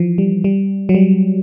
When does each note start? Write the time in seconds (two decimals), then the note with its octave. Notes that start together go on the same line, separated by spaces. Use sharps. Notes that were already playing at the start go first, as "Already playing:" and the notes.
Already playing: E3 F3
0.18 G3
0.44 G3
0.89 F#3
0.94 G3